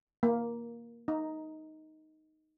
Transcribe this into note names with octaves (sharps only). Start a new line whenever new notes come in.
A#3
D#4